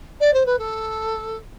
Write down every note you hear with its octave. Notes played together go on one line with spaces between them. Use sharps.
D5
C5
B4
A4